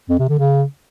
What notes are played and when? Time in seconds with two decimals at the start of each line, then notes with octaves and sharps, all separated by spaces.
0.09 F2
0.19 C3
0.29 D3
0.39 C#3